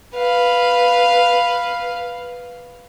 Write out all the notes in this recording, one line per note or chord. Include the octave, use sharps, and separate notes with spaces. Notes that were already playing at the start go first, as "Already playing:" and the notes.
B4 F5